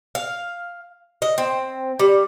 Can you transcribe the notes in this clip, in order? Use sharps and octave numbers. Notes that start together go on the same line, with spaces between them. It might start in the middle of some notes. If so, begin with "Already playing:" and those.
F5
D#5
C4
G3